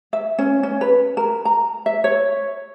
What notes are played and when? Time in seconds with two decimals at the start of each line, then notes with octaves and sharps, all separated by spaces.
0.13 E5
0.38 C#4
0.63 C#4
0.81 B4
1.17 A#4
1.45 A#5
1.86 E5
2.04 C#5